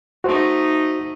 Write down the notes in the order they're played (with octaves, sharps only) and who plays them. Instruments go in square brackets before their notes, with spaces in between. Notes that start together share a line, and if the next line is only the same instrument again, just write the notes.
[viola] A3 D#4 [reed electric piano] F#4 C5